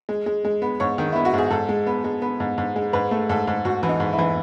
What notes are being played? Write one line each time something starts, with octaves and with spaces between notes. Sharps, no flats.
G#3
G#3
G#3
B3
G#2 C#5
D#3
B3 E4
F#4
G#2 G#4
G#2 A4
G#3
B3
G#3
B3
G#2
G#2
G#3
G#2 B4
A3
G#2 A4
G#2
G#2 F#4
E3
D#4
G#2
E4
E3